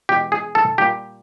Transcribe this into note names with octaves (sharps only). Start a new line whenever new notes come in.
E2 B2 G#3 G4
G#4
A4
A#2 G3 G4